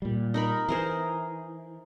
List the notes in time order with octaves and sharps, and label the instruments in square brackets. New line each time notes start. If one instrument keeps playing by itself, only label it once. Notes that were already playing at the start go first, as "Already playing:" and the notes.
[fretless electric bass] A#2 G3
[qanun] D#4 A#4 B5
[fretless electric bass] E3 [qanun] G#4 A#4 C5